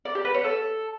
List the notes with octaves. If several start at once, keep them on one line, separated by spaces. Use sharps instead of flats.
D5
G4
B4
C#5
A4